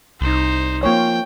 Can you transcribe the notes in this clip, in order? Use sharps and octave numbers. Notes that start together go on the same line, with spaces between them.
C2 D#4 C5
F3 A#3 C4 F4 C#5 G5